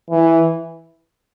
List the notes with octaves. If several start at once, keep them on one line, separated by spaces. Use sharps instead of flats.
E3